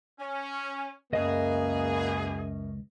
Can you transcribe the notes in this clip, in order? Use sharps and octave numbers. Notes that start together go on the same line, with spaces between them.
C#4
C#2 F#2 B2 A#3 G#4 D#5